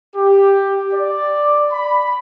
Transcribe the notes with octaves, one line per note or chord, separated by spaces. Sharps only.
G4
D5
B5